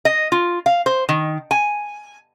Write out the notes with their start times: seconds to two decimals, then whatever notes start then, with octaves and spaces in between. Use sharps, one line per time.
0.05 D#5
0.32 F4
0.66 F5
0.86 C5
1.09 D#3
1.51 G#5